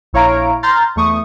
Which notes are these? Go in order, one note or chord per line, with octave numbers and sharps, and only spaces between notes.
A#1 E4 C#5 F5 A#5 D7
A#5 C6 F6 G6 A6
E2 A3 C#6 D#6